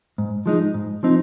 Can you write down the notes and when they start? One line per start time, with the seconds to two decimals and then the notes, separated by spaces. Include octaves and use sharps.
0.18 G#2
0.46 F3 G#3 D#4
0.74 G#2
1.03 F3 C4 D#4